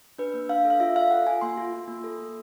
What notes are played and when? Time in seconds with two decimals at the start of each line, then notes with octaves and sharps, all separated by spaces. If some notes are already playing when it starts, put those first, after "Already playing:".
0.18 D4 B4
0.34 A#3
0.49 D4 F5
0.65 A4
0.70 F5
0.80 F4 E5
0.96 A4 F5
1.11 A4 F#5
1.26 F4 G#5
1.41 A#3 C6
1.57 F4
1.73 F4
1.88 A#3
2.04 A4
2.19 A#3